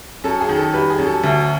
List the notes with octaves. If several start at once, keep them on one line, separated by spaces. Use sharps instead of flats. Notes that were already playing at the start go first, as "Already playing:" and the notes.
F#2 A4
G#4
D#3
A4
G3 B4
G#4
F#2
A4
D2